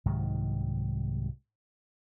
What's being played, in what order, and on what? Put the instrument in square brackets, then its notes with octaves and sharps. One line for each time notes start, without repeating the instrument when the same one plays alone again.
[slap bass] C2 G#2 D#3 F#3